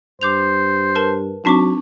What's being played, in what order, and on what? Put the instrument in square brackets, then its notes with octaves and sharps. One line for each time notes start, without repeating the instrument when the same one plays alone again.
[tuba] G2 [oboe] C5 [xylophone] D6 G6 F7
[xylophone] A#4 B4 A5
[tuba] F#3 [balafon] C4 D4 D#4 [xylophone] A5 C#6 D6